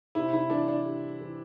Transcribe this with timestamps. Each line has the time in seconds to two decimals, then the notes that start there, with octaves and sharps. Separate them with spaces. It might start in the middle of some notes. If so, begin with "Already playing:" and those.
0.15 C3 E4
0.33 E4
0.50 E3 D4
0.68 D4
0.85 G3
1.21 E3